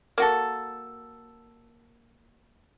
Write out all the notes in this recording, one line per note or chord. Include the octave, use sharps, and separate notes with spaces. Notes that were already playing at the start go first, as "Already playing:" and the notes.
A#3 F#4 A4